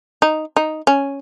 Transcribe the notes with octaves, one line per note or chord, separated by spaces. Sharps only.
D#4
D#4
C#4